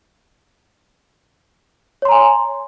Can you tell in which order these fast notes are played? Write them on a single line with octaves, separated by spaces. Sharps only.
C#5 C6 A#5 G#5